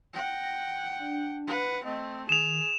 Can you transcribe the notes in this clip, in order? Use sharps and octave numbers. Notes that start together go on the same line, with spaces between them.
F#5 G5 A#6
D4
B4 F#5
A3 C4 D#5
D#3 G#4 E7 F7